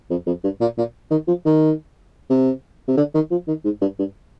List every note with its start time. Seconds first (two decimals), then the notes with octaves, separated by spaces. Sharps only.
0.10 F2
0.27 F2
0.44 G2
0.61 A#2
0.78 A#2
1.11 D#3
1.28 F3
1.46 D#3
2.30 C3
2.88 C3
2.97 D3
3.15 D#3
3.31 F3
3.48 D#3
3.64 G#2
3.82 G2
3.99 G2